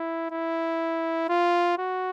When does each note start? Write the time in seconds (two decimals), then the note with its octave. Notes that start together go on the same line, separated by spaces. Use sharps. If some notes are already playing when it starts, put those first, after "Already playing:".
Already playing: E4
0.31 E4
1.29 F4
1.78 F#4